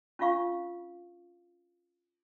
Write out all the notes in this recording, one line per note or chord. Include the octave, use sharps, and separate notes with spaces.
C#4 D4 F4 F5 C#6